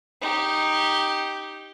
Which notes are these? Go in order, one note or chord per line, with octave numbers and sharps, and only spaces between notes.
D#4 G4